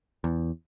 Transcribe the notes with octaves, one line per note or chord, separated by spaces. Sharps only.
E2